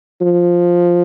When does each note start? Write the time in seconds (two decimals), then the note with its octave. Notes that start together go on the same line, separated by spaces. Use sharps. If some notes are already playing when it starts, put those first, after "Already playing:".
0.21 F3